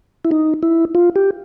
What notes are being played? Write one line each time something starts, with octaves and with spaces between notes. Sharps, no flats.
E4
D#4
E4
F4
G4